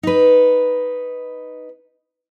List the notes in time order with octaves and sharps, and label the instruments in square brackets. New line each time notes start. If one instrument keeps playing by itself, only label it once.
[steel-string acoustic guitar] D#4 B4